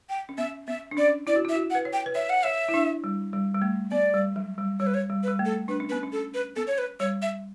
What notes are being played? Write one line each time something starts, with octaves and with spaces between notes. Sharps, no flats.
G5
C#4
B3 E5
B3 E5
D4
C#4 D5
E4 D5
F#4
E4
E5
F#4
F#5
B4
C#5
G5
B4
C#5 E5
F#5
C#5 E5
E4
D4
G3
G3
G3
A3
B3 D5
G3
F#3
G3
G3 C#5
B4
C#5
G3
B4
G3
A3
A4
D4 B4
C#4
B3 B4
C#4
A4
B4
B3 A4
C#5
B4
G3 C#5
E5